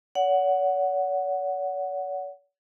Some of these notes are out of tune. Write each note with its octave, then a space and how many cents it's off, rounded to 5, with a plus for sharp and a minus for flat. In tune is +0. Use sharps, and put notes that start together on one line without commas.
C#5 +45 F#5 +0